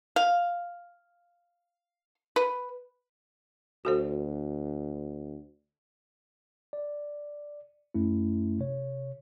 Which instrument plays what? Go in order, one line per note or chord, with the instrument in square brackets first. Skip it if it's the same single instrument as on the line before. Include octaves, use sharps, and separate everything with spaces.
[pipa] F5
B4
[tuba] D2 [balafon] F#4 A4 C5
[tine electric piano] D5
F#2 A3 C#4 E4
C3 C#5